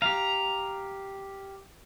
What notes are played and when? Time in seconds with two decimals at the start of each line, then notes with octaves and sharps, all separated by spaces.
0.02 G4 F5 A#5